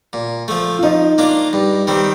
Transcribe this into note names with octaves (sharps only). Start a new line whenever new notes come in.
A#2
F3 A3
F4
F3 D#4
A#3 D4 F4
G2
D#3 G3 C4